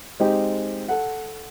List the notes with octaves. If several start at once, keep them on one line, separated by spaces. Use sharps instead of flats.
G#3 C4 D#4 G4
A4 F#5